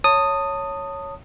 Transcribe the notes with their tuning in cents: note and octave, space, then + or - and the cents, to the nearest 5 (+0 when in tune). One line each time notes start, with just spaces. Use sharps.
C#5 +0 A5 +30 D#6 -5